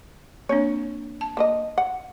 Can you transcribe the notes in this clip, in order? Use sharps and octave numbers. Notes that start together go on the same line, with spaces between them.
A#3 C4 D4 C#5
A5
A#3 B4 D#5
F#5